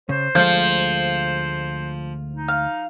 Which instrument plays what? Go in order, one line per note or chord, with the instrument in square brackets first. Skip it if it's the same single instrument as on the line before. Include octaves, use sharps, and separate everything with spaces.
[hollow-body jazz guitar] C#3 [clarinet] C5
[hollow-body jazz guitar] D2 G#3 A3 [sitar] F3 [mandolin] F5 G6
[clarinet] D#4
[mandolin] F5